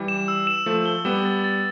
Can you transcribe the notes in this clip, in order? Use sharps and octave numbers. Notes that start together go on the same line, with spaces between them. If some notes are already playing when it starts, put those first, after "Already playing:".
Already playing: E3 G3
E7
E6
E7
F3 A3 E7
G7
G3 B3 E7
A6
A6